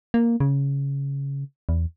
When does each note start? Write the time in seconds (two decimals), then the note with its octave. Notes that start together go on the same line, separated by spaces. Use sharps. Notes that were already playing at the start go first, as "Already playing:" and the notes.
0.14 A#3
0.40 C#3
1.69 E2